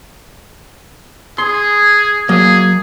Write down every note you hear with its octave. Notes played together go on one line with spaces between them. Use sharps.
G#4 C6
F#3 A#3 G#4